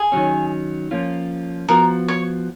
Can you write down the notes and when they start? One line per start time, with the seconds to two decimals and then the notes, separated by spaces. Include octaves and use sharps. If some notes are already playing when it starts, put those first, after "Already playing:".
Already playing: G#4
0.12 D#3 F#3 C#4
0.91 F3 A#3 C#4 F4
1.68 F3 B3 F#4 A#4
2.08 C#5